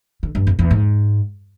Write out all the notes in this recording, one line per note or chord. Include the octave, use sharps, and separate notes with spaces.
D3
G2
F2
E2
G#2